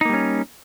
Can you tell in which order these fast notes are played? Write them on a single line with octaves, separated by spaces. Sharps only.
D#4 A#3 G3 C#4